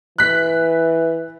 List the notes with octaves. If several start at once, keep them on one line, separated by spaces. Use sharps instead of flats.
E3 F#6 B6